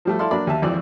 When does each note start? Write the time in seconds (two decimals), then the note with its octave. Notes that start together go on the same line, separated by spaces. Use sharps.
0.05 F3 G3 A3
0.19 E4 A4 D5 F5 C6
0.31 F#3 A#3 D4 D5 B5
0.47 D#2 E5 A5
0.62 G#1 F2 E3 D5